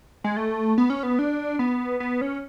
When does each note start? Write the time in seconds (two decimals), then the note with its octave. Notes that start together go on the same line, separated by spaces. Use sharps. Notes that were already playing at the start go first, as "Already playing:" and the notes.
0.24 G#3
0.37 A3
0.78 B3
0.90 C#4
1.03 B3
1.19 D4
1.59 B3
2.00 B3
2.21 C#4